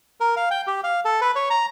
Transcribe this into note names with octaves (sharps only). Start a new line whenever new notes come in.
A#4
F5
G5
G4
F5
A4
B4
C#5
A#5